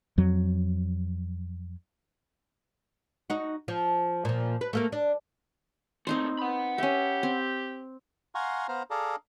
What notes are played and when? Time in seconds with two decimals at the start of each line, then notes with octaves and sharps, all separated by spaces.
0.18 F2 F#3
3.30 D#4 F#4
3.68 F3
4.25 A#2 F3
4.61 B4
4.73 A3 A#3 A#4
4.92 D4
6.07 A#2 A3 C4 D#4 C5
6.39 F#5 B5
6.78 C#4 G4 E5
7.23 C4
8.35 F5 F#5 G#5 A#5 C6 C#6
8.68 B3 C5 F5 A#5
8.91 G#4 A4 D5 F5 A5 A#5